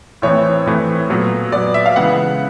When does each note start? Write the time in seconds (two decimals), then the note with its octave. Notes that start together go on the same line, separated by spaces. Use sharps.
0.22 A2 E3 A3 C4 C#5
0.66 A2 E3 A3 C4
1.10 A#2 F#3 B3
1.52 A#2 F#3 B3 D5
1.74 E5
1.86 F5
1.96 C#3 E3 G#3 B3 F#5